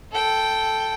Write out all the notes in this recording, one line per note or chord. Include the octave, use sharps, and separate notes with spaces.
A4 G5